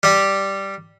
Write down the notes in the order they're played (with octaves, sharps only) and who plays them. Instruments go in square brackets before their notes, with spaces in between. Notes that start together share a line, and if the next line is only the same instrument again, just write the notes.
[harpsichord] G3 G4